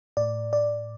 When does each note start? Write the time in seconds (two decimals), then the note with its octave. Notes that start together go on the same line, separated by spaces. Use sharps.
0.17 A2 D5
0.53 D5